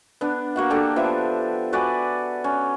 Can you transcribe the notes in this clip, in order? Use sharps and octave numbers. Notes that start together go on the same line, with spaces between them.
B3 D4
A#3 F#4 F#5
A#3 D4 G4 A4
F3 B3 E5
F#4 B4 D5 G#5
C#4